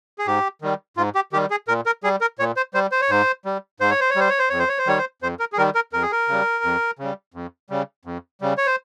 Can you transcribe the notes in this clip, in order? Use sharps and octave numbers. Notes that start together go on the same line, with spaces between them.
G#4
G#2 G4
D#3 G3
G#2 F4
G4
D#3 G3 G4
G#4
A#2 A#4
A#4
G3 G#4
A#4
A#2 C#5
C5
G3 C5
C5
C#5
G#2 C5
G3
G#2 C5
C#5
C5
C#5
G3 C5
C#5
C5
F2 C#5
C5
C#5
C5
D#3 G3 C#5
C5
F2 C5
A#4
G#4
D#3 G3 A#4
A#4
F2 A#4
G#4
A#4
C#3 G3
F2
C#3 G3
F2
C#3 G3
F2
C#3 G3
C#5
C5